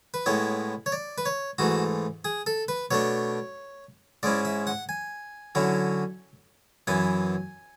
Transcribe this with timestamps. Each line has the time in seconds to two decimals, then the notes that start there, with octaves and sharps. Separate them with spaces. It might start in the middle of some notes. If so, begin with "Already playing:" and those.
0.14 B4
0.26 A2 G#3 B3 E4 C#5
0.86 C#5
0.92 D5
1.18 B4
1.26 C#5
1.58 G#2 E3 A3 F#4
2.25 G#4
2.47 A4
2.68 B4
2.91 B2 A3 D4 C#5
4.23 G#2 G#3 C#4 E4 D5
4.45 E5
4.67 F#5
4.89 G#5
5.55 D3 F#3 C#4 E4
6.87 F#2 E3 B3 E4 G#5